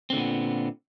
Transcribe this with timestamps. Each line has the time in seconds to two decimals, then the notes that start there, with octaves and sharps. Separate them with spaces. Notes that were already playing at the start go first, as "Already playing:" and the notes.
0.10 C4
0.13 D3
0.15 A#2
0.18 B3